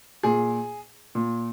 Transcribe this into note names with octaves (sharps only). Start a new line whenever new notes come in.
A#2 G#4
A#2